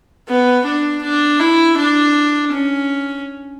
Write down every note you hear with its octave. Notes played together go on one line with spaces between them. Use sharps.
B3
D4
D4
E4
D4
C#4